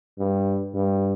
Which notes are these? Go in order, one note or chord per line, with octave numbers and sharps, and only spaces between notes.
G2
G2